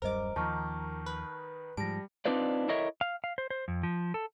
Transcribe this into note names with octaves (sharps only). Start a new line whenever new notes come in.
D1 F#2 G3 A#4 C5 D#5 D6
D#2 D#3 F3 D#4 A5 C#6 F6
B4
G#2 F3 G3 A5 A#6 D7
C4 D4 D#4 F4 B4 D5
E4 A4 A#4 C#5 D#5 E5
F5
F5
C5
C5
F2
F3
A4